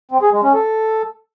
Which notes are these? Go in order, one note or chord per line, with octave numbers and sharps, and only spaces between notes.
C4
G#4
G#3
C#4
A4